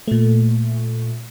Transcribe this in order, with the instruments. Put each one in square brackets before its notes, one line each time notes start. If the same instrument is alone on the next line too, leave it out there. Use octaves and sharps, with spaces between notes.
[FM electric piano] A#2 A3